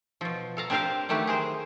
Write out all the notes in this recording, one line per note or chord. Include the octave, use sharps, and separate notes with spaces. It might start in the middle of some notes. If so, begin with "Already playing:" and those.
B2 F3
A4 F5 A#5
C4 D4 G4 A#4 C5 F5
D#3 F#3 A3 G4 B4
G#4 A#4 C5